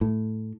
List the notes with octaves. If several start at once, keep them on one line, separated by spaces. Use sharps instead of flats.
A2